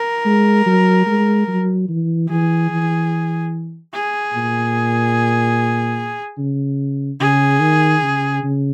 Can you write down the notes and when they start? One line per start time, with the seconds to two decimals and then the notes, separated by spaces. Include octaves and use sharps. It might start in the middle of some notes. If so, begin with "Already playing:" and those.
Already playing: A#4
0.26 G#3
0.66 F#3
1.06 G#3
1.48 F#3
1.89 E3
2.29 E3 G#4
2.70 E3
3.94 G#4
4.33 A#2
6.38 C#3
7.20 C#3 G#4
7.60 D#3
8.02 C#3
8.43 C#3